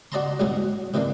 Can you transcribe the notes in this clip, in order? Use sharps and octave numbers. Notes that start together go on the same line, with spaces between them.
F#4 D5 D#5 A5 A#5 C6
A1 B2 F#3 G#4 F#5
C3 D#3 E3 A#3 D4